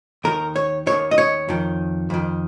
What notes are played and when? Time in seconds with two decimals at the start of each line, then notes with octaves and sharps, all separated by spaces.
0.24 D#2 D#3 A#4
0.56 C#5
0.86 D#2 D#3 C#5
1.11 D#5
1.18 C#5
1.49 F2 D#3
2.10 F2 D#3